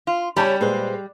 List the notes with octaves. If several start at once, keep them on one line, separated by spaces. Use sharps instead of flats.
F4
C#3 G3 C#4 G4 C#5 A5 B5
A#2 G#3 B4 C5